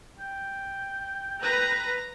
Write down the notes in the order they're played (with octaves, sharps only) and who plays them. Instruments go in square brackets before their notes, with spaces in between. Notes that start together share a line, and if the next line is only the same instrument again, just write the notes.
[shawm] G5
[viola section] B4 [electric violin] A#5